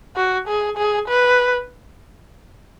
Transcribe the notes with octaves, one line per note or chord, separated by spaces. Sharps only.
F#4
G#4
G#4
B4